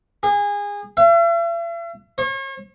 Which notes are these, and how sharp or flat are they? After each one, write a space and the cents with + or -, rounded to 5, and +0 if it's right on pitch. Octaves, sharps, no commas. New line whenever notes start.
G#4 -25
E5 +45
C#5 -40